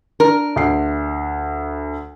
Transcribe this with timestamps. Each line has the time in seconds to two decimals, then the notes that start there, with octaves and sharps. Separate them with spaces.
0.20 D4 A#4
0.56 D2 C7